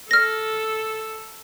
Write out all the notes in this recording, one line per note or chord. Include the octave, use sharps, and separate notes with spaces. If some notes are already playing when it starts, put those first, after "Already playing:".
A4 F6 A#6